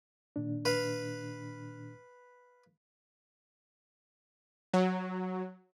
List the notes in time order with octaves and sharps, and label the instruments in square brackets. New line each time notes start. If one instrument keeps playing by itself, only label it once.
[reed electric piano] A#2 D#3 D4
[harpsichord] B4 F5
[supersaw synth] F#3